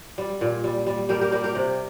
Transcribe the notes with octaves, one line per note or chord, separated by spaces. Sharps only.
G3
A#2
G3
G3
G3 G4 A#4
G4 A#4
G3 G4 A#4
G4 A#4
C3